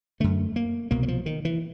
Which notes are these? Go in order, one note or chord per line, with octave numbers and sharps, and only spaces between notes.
F#2 D3 A3
A#3
C2 B2 A#3
F#3
F3
D#3
E3